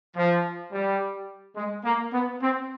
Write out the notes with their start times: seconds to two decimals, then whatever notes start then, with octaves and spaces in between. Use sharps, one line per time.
0.16 F3
0.72 G3
1.55 G#3
1.84 A#3
2.12 B3
2.41 C4